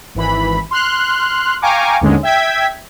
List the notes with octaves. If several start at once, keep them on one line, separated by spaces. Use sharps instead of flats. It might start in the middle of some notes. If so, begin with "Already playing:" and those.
G#1 E3 B5
C6 F6 F#6
F5 G5 G#5 A#5 C#6 D6
D#2 G#2 D3 G#3 C#4
E5 G5 G#6 B6